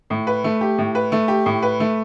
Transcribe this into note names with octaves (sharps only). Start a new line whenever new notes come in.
A2
B4
A3
G4
A2
B4
A3
G4
A2
B4
A3